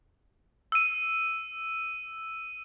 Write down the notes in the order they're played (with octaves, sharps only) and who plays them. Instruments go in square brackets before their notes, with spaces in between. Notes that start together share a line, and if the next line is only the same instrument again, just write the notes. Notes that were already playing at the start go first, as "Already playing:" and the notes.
[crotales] E6 D#7